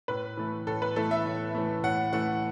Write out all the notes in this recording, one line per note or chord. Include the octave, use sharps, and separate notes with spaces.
A2 B4
E3 A3
A2 A4
B4
E3 A3 A4
E5
A2
E3 A3
A2 F#5
E3 A3 F#5